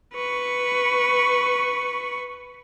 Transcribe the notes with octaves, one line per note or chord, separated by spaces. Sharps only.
B4 C#6